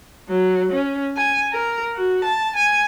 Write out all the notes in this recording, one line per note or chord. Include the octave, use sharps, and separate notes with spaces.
F#3
C#4
G#5
A#4
F#4
A5
G#5